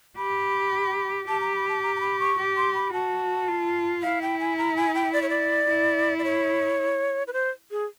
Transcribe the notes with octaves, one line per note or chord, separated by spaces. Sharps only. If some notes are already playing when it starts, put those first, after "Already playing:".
G4 B5
G4 A5
A#5
B5
A5
A#5
A#5
B5
C#6
G4
C6
B5
F#4 A5
F4
E4 F5
G5
G#5
A#5
G#5
G5
D5
C#5
D5
E4
D5
C#5
B4
C5
G#4